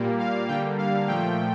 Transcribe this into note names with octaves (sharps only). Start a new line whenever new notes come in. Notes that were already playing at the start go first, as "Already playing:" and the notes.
Already playing: A#2 G3 A#3
F5
D3 G3 A#3 G5
F5
A#2 F3 A3 G5